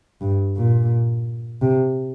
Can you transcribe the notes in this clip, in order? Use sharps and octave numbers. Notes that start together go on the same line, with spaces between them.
G2
A#2
C3